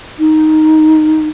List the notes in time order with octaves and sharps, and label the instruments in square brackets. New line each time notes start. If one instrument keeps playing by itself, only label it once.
[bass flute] D#4